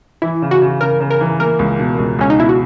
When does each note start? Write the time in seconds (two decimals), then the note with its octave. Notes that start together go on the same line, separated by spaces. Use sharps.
0.22 E3 E4
0.42 C#3
0.51 F#4
0.62 C#3
0.81 C#3 A#4
1.00 C#3
1.11 A#4
1.21 E3
1.40 A#3 A#4
1.59 C#2
1.79 B2
1.99 C#2
2.19 C#2 C#4
2.30 D#4
2.38 B2 E4
2.49 F#4